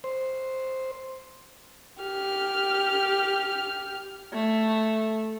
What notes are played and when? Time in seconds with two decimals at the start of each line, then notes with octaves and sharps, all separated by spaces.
0.04 C5
2.03 G4 F6
4.33 A3